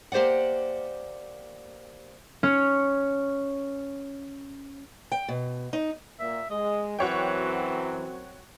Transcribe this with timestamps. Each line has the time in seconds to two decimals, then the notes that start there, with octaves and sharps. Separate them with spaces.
0.12 A#3 G4 C5 D5 F#5
2.43 C#4 C#5
5.12 G5
5.28 B2
5.73 D#4
6.20 A#2 A#3 E5
6.50 G#3 D#5
6.99 F#2 E3 F#3 C4 F#4 C#5 G5